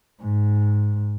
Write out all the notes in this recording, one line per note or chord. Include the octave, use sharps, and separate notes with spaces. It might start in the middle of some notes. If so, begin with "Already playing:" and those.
G#2